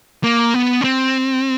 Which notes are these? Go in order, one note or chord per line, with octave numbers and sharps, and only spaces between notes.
A#3
B3
C#4
C4